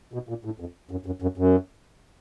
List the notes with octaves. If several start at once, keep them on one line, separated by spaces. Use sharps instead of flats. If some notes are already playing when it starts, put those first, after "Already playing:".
B2
A#2
A2
F2
F#2
F#2
F#2
F#2